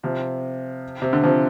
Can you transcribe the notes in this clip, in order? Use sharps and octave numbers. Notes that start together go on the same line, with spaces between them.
C3 F3
C3
D3
C3 F3